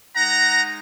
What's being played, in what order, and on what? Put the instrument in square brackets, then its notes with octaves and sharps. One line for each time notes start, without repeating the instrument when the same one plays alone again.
[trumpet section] G#3 D#4 F#5 A#5